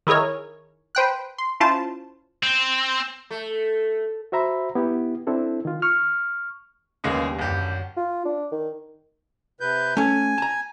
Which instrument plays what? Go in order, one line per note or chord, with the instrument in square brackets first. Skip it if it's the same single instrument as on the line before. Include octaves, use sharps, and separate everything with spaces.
[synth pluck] D#3 E4 G#4 A#4 C#5
B4 C5 G5 F#6
C6
C#4 E4 F4 C5 A5
[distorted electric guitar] C4
[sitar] A3
[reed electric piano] F#4 C5 E5 A#5 B5
B3 E4 G4
C4 D4 E4 A4
D#3 F4
C#6 F6
[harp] G1 D#2 G3 [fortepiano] C#3 G#3 A#3
[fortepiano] A1 G4 [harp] F#2 D4 G6
[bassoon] F4
D4
D#3
[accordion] C3 B4 G6
[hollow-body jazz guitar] A3 C#4 [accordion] G#5
[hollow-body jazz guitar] A5 A#5